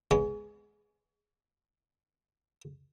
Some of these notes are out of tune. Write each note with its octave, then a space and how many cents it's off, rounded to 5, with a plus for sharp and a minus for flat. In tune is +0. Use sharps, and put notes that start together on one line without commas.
G#3 +5 B3 +0 C#5 +35